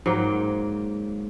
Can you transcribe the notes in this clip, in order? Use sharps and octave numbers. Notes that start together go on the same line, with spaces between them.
G#2 F#3 A#3 G5